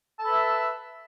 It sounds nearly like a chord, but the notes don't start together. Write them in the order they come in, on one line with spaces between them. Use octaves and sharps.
A5 A4 B5 B4 E5